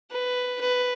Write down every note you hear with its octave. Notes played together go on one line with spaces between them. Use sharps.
B4
B4